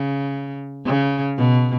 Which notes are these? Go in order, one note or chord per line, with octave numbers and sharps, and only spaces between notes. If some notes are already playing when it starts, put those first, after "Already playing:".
Already playing: C#3
C#3
B2